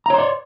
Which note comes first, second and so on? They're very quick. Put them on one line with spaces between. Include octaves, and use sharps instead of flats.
A#5 C#5 C6 D5